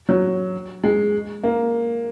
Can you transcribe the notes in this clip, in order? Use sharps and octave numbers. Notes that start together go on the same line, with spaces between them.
F#3
G#3
A#3